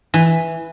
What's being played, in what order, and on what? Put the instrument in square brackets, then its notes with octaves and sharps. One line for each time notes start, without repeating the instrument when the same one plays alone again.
[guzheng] E3